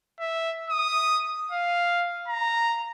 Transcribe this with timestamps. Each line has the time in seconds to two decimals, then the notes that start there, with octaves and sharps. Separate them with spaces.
0.20 E5
0.70 D#6
1.51 F5
2.28 A#5